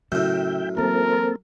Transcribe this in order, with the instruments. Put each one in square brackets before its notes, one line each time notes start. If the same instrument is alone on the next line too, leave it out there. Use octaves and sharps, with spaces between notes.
[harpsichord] F#2 A2 [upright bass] C#3 [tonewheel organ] E5 G5
[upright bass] E3 F#3 [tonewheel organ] A#3 C4 A4 [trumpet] A#4